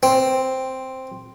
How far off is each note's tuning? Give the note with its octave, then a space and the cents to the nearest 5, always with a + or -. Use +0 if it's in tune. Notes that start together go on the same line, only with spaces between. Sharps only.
C4 +0